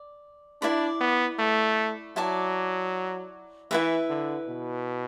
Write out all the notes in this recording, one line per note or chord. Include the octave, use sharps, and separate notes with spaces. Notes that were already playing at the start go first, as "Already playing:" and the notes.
Already playing: D5
D4 E4 D5 B5
B3
A3
F#3 E4 D5 A5 D6
E3 E4 B4 E5
D3
B2